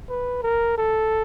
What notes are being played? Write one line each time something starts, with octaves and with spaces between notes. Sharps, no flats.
B4
A#4
A4